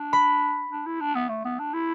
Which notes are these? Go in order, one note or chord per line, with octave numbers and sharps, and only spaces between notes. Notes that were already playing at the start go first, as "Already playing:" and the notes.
Already playing: D4
B5
D4
E4
D4
B3
A3
B3
D4
E4